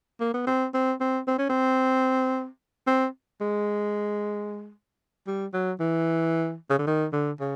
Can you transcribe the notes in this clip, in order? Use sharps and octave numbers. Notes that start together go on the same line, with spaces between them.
A#3
B3
C4
C4
C4
C4
C#4
C4
C4
G#3
G3
F#3
E3
C#3
D3
D#3
D3
C#3